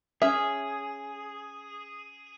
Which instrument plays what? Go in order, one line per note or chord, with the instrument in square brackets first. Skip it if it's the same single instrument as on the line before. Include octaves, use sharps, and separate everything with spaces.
[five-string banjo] C#4 E5 [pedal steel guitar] G#4